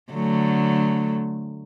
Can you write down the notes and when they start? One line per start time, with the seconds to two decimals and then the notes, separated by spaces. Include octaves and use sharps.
0.13 D3 F#3 A3